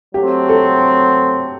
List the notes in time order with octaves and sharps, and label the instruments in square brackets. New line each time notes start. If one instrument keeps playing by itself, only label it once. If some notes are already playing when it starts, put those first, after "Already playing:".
[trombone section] F#3 A3 C4 [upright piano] G4
[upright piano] A4